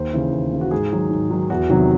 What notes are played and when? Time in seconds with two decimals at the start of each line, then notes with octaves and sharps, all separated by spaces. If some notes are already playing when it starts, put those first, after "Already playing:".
Already playing: D#2 C5
0.13 C#3 E3
0.32 D#2
0.52 C#3 E3
0.61 F#4
0.71 G#2 G#4
0.92 D#3 F#3
1.10 G#2
1.31 D#3 F#3
1.50 E2 F#4
1.70 C3 D#3 F#3